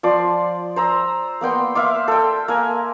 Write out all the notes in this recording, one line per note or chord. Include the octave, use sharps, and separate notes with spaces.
F3 D5 C6
C5 A#5 E6
A#3 B3 G5 C6
E5 F5 C6 D6
A4 G5
A#3 A#4 G#5